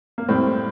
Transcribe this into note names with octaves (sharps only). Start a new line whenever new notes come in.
A#3
A2 G3 C4